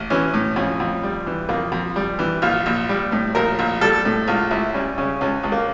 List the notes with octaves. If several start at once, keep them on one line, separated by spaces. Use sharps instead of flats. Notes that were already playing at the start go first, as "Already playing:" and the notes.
Already playing: A1
E3 C#4
A2
F2 C#4
F2
G3
E3
F2 A#3
F2
G3
E3
A#1 F4
A#1
G3
A2
A#1 A#4
A#1
G3 A4
A2
C#2 F4
C#2 E4
G3 C#4
C#3 C#4
C#2 C#4
C#2
A#3